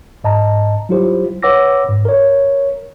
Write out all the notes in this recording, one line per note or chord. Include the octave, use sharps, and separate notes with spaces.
G#2 D#5 A5 A#5
F#3 G3 E4 F4 G4 C5
B4 C#5 F#5 D6 E6 A#6
G#2
A#4 C#5